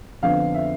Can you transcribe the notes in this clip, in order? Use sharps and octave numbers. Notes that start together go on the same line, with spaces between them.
F2 D3 F3 B3 F5
E5